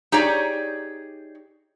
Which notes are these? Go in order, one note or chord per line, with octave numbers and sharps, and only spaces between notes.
D#4 G4 G#4 C#5 D5